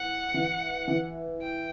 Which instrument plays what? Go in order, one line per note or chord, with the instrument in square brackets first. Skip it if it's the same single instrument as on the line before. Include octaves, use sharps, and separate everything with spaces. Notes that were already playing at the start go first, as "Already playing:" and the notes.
Already playing: [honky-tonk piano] E3 [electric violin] F#5
[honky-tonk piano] E3
E3
[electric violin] G5